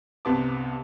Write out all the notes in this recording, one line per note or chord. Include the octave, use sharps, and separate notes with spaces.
G1 C2 C3 B3 A5 D6